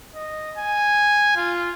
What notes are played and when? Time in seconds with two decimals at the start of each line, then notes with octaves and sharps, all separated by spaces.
0.15 D#5
0.58 G#5
1.36 F4